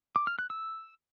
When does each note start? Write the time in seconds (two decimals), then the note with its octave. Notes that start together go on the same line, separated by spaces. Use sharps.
0.16 D6
0.27 F6
0.39 F#6
0.50 E6